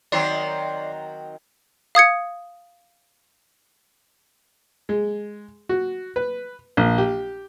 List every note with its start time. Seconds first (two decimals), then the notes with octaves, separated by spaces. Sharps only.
0.12 D#3 F#3 C4 D5 C6 C7
1.95 F5 D#6 G#6 C#7
4.89 G#3
5.69 F#4
6.16 B4
6.77 A#1
6.98 G4